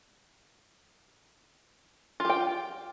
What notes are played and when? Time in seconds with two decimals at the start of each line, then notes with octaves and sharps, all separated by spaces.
2.20 F4
2.25 G4
2.30 G5